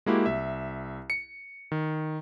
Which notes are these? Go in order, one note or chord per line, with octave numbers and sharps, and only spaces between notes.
G#3 A#3 E4 F#4 G4
C2 E5
C#7
D#3